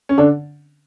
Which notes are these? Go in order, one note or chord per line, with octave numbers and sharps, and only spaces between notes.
C#4
D3 D4